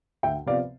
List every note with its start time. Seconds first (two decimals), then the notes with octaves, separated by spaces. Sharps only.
0.23 D2 E5 G5
0.46 C3 F3 B3 D5 F5